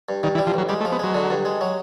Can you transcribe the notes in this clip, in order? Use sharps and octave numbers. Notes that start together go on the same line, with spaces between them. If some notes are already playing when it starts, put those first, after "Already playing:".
G2
G2 D#3
E3
G3
F3
A1 F#3
G3 G#3
A3
F3
B3
F#3 G#3
D3
G2
G#3
F#3